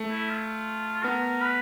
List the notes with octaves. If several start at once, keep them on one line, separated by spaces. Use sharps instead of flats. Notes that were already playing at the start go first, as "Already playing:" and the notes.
Already playing: A3
E4
F4
B3 A#4
B4